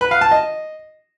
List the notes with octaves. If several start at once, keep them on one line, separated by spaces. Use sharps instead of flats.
B4
F5
A5
D#5